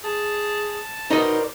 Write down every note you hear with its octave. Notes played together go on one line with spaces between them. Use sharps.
G#4 A5
B2 D#4 A#4 C5 D5 D#5